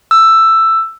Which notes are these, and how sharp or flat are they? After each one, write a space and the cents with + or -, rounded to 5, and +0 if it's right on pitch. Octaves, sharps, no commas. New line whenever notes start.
E6 +10